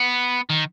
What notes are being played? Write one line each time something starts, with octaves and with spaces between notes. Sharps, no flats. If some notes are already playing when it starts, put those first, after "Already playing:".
Already playing: B3
D#3